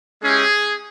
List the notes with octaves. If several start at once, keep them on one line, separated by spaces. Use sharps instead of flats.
G#3 C#4 E4 G4 G#4